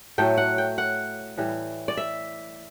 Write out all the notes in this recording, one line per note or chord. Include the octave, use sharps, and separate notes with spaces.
A2 F#3 A3 G5
F#5
G5
F#5
A2 E3 G3
D5
E5